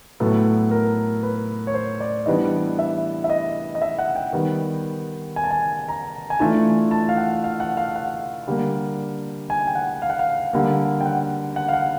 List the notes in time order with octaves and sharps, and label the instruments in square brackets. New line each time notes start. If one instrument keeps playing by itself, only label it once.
[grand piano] A2 F#3 B3 A4
A4
A#4
B4
C#5
C5
D5
E3 G3 B3 D4 D#5
E5
E5
D#5
D#5
E5
F#5
G5
D#3 G3 B3
G#5
A5
G#5
A#5
G#5
E3 A3 D4 F4 A5
A5
F5
F#5
F5
F#5
F5
F#5
D3 G3 A#3
G#5
G5
F#5
F5
F#5
F5
D3 G3 A#3
G5
F#5
F#5
F5
F#5